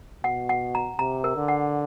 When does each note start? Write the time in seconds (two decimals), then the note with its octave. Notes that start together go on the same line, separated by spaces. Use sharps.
0.24 B2 F#5
0.49 F#5
0.75 A#5
0.99 C3 A#5
1.24 A#4
1.36 D3
1.48 F#5